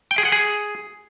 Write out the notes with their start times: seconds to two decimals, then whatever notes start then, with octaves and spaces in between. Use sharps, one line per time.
0.11 G5
0.18 G#4
0.25 F#5
0.32 G#4